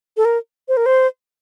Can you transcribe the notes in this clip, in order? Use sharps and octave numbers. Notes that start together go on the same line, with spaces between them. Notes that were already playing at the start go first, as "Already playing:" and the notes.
A4
A#4
C5
A#4
C5